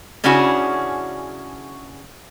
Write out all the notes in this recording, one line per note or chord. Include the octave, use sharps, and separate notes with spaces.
C#3 C#4 D4 E4 F#4 G#4